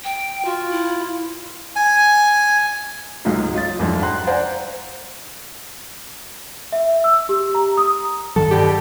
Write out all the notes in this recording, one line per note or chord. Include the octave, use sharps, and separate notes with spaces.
G5
F4 F#4
E4
G#5
C#2 G#2 F#3 A3 D#4 F4
F#3 F4 D#5 A6
C2 F2 G#2 D4
F#5 G5 A5 A#5 C6 F#6
C5 D5 F5 F#5 G#5 A#5
E5
E6
G4
A#5
D#6
G2 D#3 F#3 A4
B2 D3 G4